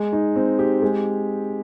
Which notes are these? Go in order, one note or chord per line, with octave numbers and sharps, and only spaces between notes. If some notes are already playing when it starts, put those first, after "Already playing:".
Already playing: G#3
D#4
C4
G4
G#3